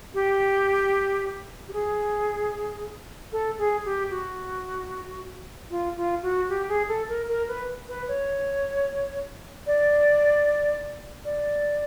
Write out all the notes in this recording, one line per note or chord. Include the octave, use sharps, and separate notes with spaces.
G4
G4
G#4
A4
G#4
G4
F#4
F4
F4
F#4
G4
G#4
A4
A#4
A#4
B4
B4
C#5
D5
D5